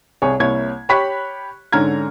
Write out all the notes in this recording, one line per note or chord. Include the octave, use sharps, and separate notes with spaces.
C2 G#4 C#5
C2 A#3 E4 C#5 G#6
G4 C#5 B5 C#6 F#6 B6
G#2 D3 C#4 A#5 F6 G#6